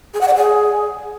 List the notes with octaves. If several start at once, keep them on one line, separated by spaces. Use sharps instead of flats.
G#4
F#5
D5
G#4